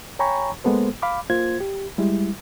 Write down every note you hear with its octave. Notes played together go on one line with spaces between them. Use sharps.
C#5 G5 G#5 A#5 B5 C#6
G#3 A#3 B3 A4 C5
F5 B5 D6
A#3 F4 C5 G#6
G4
G3 G#3 E4